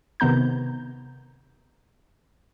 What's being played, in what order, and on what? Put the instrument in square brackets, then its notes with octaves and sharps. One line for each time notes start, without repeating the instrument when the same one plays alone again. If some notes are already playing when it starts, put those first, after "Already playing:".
[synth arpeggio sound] C3 D#3 B3 A#5 G6